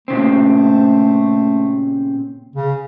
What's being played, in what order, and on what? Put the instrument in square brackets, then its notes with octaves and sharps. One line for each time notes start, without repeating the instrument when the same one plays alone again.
[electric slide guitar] A#2 C#3 C4 [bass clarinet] A3
[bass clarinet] C#3